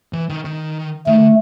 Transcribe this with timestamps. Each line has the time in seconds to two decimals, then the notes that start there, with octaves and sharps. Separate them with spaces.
0.13 E3
0.29 D#3
0.45 D#3
1.07 D#3 A3
1.18 D3